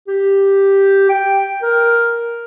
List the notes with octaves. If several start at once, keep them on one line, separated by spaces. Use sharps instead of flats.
G4
G5
A#4